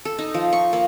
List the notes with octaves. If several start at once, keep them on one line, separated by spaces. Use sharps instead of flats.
A4
D#4
F3
C#6
A#3